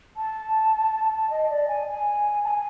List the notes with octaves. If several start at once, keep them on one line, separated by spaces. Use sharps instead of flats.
A5
D#5
D5
G#5
G#5
A5
G#5